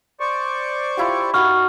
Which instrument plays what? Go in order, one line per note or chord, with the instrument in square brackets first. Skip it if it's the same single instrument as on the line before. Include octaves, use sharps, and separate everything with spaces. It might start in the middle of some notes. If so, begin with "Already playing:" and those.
[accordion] C5 D5 C#6
[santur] E4 F4 G4
[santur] D#4 F#4 B5 [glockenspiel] C#6 F6